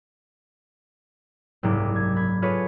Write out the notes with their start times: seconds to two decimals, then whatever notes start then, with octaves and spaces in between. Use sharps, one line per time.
1.63 F#1 C2 G#2 D6
1.95 G#6
2.16 B5 G#6
2.42 F4 G#4 A4 B4 C#5